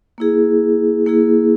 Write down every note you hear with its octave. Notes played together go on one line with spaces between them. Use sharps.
A#3 E4 G#4
A#3 E4 G#4